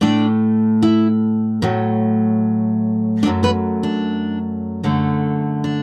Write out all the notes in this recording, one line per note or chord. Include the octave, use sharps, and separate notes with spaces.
A2 A3 D4 D5
E4 E5
A2 F#3 A3
F#2 F#3 A3 D4 D5
B3 B4
D4
F#2 D3 A3
D4